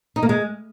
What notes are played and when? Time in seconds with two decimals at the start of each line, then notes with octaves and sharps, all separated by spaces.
0.16 D#4
0.23 A#3
0.29 G#3